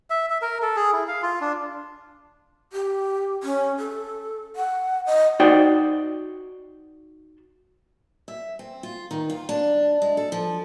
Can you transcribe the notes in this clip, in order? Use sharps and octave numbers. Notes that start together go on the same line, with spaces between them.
E5
E5
A#4
A4
G#4
E4
F5
F4
D4
G4
C#4
A4
F#5
D#5
D#4 F#4 C5 D5 G5
E5
C4
F4
D#3
F4
D4
G#3
A4
F3